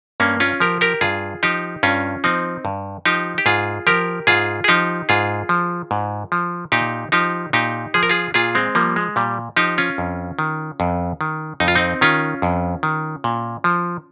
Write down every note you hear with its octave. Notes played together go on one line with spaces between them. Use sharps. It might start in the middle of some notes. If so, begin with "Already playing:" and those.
G2 A#3 C#4
C#4 F4
F3 G4 A#4
G4 A#4
G2 F4 G#4
F3 D#4 G4
G2 C#4 F4
F3 C4 D#4
G2
F3 D#4 G4
G4
G#2 F4 G#4
F3 G4 A#4
G#2 F4 G#4
G#4
F3 D#4 G4
G#2 F4 G#4
F3
G#2
F3
A#2 D#4 G4
F3 D#4 G4
A#2 D#4 G4
F3 G#4
A#4
F4 G#4
A#2 F4 G#4
G#3 C4
F3 G3 A#3
G#3
A#2 G3
F3 D#4 G4
C#4 F4
F2
D#3
F2
D#3
F2 D#4
F4
C4 D#4
D#3 C#4 F4
F2
D#3
A#2
F3